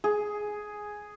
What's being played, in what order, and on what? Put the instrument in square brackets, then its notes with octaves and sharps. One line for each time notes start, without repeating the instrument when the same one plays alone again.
[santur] G#4